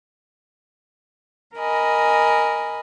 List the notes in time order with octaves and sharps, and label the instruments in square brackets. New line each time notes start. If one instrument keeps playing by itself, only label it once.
[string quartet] A#4 D#5 G#5 B5